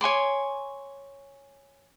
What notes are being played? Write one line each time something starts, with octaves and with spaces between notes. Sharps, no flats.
C#5 G#5 C6 D6